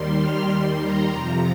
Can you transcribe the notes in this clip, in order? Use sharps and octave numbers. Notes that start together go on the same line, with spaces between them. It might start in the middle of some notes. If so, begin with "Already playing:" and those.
Already playing: D#2 D#3 G3 C6
F6
D#2 D#3 G3 C6
A#5
F2 C3 F3